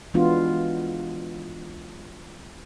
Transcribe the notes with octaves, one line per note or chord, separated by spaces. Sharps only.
E3 G#3 B3 D4 F4 F#4